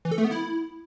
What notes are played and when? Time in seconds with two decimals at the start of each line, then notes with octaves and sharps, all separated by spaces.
0.05 E3
0.11 A4
0.18 A3
0.25 B3
0.31 E4